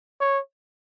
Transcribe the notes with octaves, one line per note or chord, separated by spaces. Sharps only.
C#5